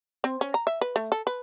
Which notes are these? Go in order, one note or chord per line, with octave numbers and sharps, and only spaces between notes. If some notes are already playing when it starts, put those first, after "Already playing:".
C4
C#4
A#5
E5
B4
A3
A4
B4